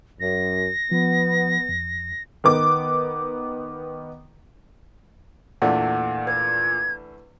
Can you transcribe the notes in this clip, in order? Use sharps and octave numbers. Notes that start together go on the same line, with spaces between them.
F#2 A#6
F3 B3
F2
D#3 B3 D6
E2 A#2 A3 D4 F#5
B4 G#6